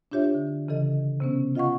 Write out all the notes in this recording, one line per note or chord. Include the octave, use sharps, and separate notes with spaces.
D4 F4 G4 C#5 E5
D3
C#3 E3 A4 D#5
C3 B3 C#4
F4 D#5 F5 F#5 C#6